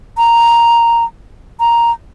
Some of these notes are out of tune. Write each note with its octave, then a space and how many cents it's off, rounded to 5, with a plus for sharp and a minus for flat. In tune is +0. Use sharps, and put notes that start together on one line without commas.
A#5 +0
A#5 +5